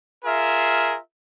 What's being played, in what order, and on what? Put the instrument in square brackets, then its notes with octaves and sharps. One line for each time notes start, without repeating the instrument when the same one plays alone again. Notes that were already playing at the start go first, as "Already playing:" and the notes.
[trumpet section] F4 G#4 A#4 E5